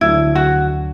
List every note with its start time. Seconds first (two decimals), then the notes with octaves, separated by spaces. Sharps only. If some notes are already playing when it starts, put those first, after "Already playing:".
0.01 D2 D3 F#3 D4 E4
0.35 F#4